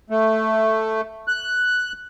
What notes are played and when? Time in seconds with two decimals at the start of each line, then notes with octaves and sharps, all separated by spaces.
0.10 A3
1.28 F#6